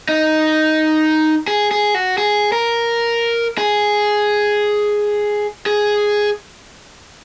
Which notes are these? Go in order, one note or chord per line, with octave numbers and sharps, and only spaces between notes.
D#4
G#4
G#4
F#4
G#4
A#4
G#4
G#4